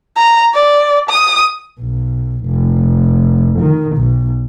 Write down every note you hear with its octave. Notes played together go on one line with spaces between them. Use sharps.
A#5
D5
D#6
B1
F1
D#3
B1